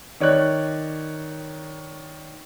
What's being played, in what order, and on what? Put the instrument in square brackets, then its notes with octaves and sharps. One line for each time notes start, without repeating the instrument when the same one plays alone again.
[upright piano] D#3 C#5 D5 F#6